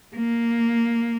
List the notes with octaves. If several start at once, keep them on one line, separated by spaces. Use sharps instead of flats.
A#3